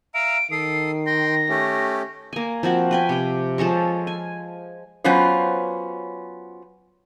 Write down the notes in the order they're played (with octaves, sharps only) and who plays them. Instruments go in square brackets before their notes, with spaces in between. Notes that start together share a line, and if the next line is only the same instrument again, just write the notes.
[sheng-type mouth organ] E5 F5 A#5 [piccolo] D7
[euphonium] D#3 [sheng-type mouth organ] A4 D#6 [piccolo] C7
[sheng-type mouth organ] G5 C6 [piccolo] A#6
[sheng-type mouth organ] A3 C#4 G4
[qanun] A#3 G#5
F3 C4 F#4 F#5
B4 G5 G#5
C3 G5
F3 G#3 A4 C#5
G#5
[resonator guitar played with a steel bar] F#3 B3 C#4 F4 B4 C5